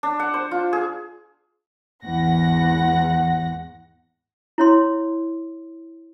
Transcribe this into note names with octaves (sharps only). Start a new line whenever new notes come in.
D4
F#5
C5
F4
G#4
G#1 E2 F#5 A#6
E4 C#5 C6